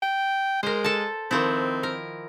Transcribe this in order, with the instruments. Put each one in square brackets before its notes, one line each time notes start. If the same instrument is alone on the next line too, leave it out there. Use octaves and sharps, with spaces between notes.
[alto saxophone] G5
[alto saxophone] G#3 [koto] A#4 C5
[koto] A4 A5
[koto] D#3 F3 E4 [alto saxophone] C4
[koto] A#4